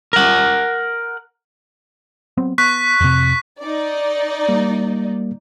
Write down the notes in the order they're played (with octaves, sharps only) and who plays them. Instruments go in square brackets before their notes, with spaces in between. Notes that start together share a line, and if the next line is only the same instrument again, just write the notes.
[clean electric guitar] A#4 F#5
[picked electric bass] F#3 B3 C4
[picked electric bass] B3 [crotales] C#6 F#6 B6
[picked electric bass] F2 C3
[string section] D#4 D5
[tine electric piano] G3 A#3